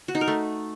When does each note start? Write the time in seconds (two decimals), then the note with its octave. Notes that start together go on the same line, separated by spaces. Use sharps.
0.08 F#4
0.15 D#4
0.21 A#4
0.28 A3